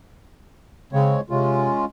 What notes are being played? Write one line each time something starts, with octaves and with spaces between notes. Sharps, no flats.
C#3 G#3 C4 C#5
C3 G#3 C#4 F4